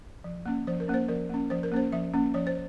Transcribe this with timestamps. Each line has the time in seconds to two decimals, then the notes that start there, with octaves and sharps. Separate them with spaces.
0.24 F3
0.46 A#3 C#4
0.67 F3 C5
0.80 A#4
0.88 A#3 C#4
0.94 C5
1.08 F3 A#4
1.30 A#3 C#4
1.50 F3 C5
1.63 A#4
1.72 A#3 C#4 C5
1.92 F3 E5
2.14 A#3 C#4
2.34 F3 C#5
2.47 C5